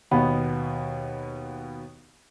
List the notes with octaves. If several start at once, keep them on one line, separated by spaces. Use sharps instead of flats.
D#2 B2 B3 B5